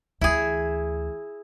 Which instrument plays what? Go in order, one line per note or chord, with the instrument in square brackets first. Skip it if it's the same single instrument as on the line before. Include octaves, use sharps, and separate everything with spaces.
[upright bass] D2 E3 [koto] E4 G#4